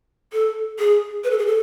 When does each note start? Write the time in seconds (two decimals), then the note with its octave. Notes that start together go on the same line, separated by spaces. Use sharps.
0.33 A4
0.79 G#4
1.24 B4
1.31 A4
1.38 G#4
1.46 A4